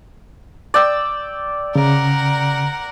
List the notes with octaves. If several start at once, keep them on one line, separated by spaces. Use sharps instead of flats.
D5 G5 E6
C#3 A#4 F#5